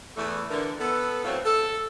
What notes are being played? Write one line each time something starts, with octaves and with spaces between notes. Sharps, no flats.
E2 A3
D3 E3 A#4
B3 A4
E2 A2 F#3 A3 C4 F5
A4